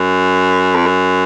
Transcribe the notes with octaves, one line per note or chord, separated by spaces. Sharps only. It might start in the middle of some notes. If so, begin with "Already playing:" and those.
Already playing: F#2
F2
F#2